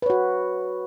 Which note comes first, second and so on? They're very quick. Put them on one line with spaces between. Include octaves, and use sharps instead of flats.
B4 C#5 F#4